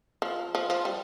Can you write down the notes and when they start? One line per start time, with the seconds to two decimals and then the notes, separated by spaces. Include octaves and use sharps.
0.22 F3
0.55 F3
0.70 F3
0.85 G3